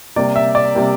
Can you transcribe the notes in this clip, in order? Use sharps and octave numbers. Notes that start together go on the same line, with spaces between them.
C3 G3 A#3 D5
E5
D5
C3 G3 A#3